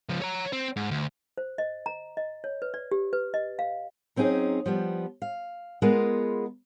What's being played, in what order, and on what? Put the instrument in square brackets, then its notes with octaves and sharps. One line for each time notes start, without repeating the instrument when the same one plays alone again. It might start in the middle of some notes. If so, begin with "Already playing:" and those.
[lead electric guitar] C#2 F3
C#5 A#5
C4
G#2
D2
[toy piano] C5
D#5
A#5
D#5
C#5
B4
D5
G4
B4
D#5
F5
[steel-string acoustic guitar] F#3 C4 C#4 D#4 G#4
F3 G3 B3
F5
G#3 B3 F4 G#4 A#4 B4